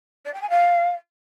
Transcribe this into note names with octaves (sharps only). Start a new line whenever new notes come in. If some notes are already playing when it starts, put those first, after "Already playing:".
D5
G5
G#5
F5